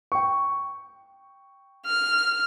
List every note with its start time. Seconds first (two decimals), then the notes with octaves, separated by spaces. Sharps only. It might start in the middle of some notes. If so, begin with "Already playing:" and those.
0.12 G5 C#6
1.86 F6